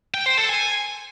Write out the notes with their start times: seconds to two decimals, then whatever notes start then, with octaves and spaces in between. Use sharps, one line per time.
0.14 G5
0.26 C5
0.38 A4
0.49 G#5